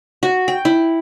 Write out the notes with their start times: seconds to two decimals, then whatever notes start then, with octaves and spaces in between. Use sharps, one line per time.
0.23 F#4
0.48 G5
0.65 E4